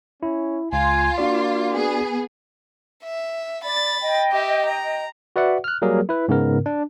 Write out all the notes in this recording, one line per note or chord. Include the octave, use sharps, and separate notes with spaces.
C#4 E4
C#2 F4 G#5
A#3 D4 F#4 D5
B3 G#4
E5
D5 B5 A6
D#5 G5
G4 E5
A#5
F#4 B4 D5 E5 F#5
F6 F#6
F#3 G3 A#3 G#4 A#4
E4 B4
G#2 C#3 B3 A#4
D4